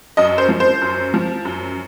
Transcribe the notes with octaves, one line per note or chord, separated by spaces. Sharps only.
F#2 D#5
C5
F3
C5
F#2
F3
F#2